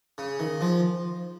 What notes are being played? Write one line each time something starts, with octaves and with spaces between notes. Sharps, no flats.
C#3
D#3
F3